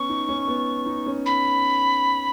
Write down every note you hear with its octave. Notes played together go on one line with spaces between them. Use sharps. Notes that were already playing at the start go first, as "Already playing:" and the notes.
Already playing: B3 C#4 C#6
D#4
C#4
B3
D#4
C#4
B5